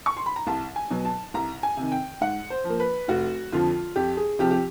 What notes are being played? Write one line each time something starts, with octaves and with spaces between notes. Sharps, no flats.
C#6
C6
B5
A#5
C2 A5
G#5
B2 F#3
A5
C2 A#5
G#5
C3 D#3
G5
G#2 F#5
C5
F3 A#3
B4
F1 F#4
F2 D3 F3 F4
F2 G4
G#4
C3 F3 G4
G4